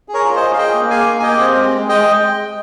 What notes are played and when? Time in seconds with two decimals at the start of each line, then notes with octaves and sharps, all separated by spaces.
0.08 G#4
0.14 A#4 C#5
0.25 F4
0.36 C5 D#5
0.41 G#4
0.53 F5
0.58 G#4 D#5 G5
0.74 A#3
0.90 G#4 F5 G#5
1.07 A#3
1.19 G#5
1.23 G4 D#5 G5
1.39 C4
1.55 G#3
1.72 G#3
1.88 G#3 D#5 G5